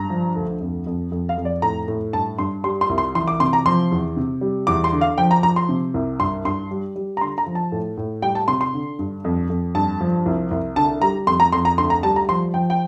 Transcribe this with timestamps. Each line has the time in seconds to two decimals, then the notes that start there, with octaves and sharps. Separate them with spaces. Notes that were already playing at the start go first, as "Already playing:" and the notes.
Already playing: G2 A#5
0.10 F3
0.36 D2
0.61 F2
0.86 F2
1.12 F2
1.29 F5
1.37 F2
1.45 D5
1.62 A2 A#5
1.88 A2
2.13 G2 A5
2.38 G2 C6
2.64 G3 C6
2.81 C6
2.89 C2
2.98 C6
3.15 E3 C6
3.28 D6
3.40 C3 C6
3.53 A#5
3.65 F3 C6
3.91 E2
4.16 C3
4.41 G3
4.67 E2 D6
4.84 C6
4.92 D3
5.01 F5
5.18 F3 G5
5.31 A#5
5.43 F3 A#5
5.56 C6
5.69 C3
5.94 C2
6.20 G2 C6
6.45 G2 C6
6.71 G3
6.96 G3
7.17 A#5
7.21 D3 C6
7.38 A#5
7.47 F3
7.55 A5
7.72 A2
7.97 A2
8.22 G3 G5
8.35 A5
8.48 C3 C6
8.61 C6
8.74 D3
8.99 G2
9.25 F2
9.50 F2
9.75 G2 A5
10.01 F3
10.26 C2
10.51 C2
10.76 D3 A5
11.01 G3 A#5
11.27 F2 C6
11.40 A#5
11.52 F2 C6
11.65 A#5
11.78 D2 C6
11.90 A#5
12.03 G3 A5
12.16 A#5
12.29 F3 C6
12.54 F3 G5
12.70 G5